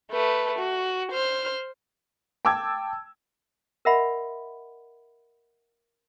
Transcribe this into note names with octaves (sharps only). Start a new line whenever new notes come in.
A3 B4
F#4
C5 F6
G5 A5 D6 E6 G#6
A#4 D#5 E5 F#5 B5 C6